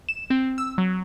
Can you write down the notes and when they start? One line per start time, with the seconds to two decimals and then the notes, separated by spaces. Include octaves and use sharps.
0.09 E7
0.30 C4
0.58 E6
0.78 F#3